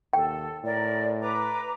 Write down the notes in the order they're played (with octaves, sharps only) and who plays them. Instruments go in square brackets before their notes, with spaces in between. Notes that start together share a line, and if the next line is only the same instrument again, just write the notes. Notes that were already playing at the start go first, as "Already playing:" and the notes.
[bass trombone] D#2 [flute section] A4 [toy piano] G5
[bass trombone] A2 [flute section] A#4 D5
[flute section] B4 A#5 D6